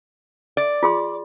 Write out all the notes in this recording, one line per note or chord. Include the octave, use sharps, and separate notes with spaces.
D5
F4 G#4 C6